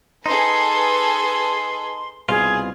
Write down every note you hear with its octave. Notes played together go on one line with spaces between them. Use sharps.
D#4 G#4 A4 B4 C6
C2 B2 F4 G#4